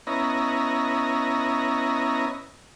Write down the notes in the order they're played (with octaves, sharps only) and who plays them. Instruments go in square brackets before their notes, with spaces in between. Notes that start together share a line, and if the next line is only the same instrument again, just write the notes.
[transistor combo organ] B3 C#4 E4 D#5 A#5